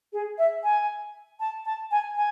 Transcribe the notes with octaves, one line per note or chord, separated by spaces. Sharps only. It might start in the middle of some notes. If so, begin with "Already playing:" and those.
G#4
E5
G#5
A5
A5
G#5
G#5